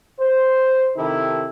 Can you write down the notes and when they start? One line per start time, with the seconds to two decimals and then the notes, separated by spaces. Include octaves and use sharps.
0.19 C5
0.96 C3 D#3 D#4 E4 G4 A4